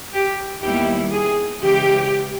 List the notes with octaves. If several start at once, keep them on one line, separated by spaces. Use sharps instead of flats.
G4
D#2 D#3 G3 B3 E4 G4
G#4
C#3 E3 G#3 G4